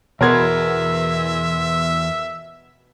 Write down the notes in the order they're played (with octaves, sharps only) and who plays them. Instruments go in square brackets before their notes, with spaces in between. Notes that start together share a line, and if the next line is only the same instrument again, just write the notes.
[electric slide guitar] E2 G#4 [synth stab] B2 B3 [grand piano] A#4 C6 G#6 [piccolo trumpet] E5